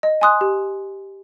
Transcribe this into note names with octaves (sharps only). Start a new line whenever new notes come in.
D#5
G#5 C6 D#6 F#6
G4